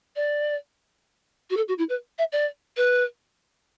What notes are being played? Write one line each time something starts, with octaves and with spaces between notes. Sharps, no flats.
D5
F#4
A4
F#4
E4
B4
E5
D5
B4